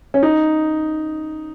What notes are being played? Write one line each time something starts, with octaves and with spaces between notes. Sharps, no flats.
C#4
D#4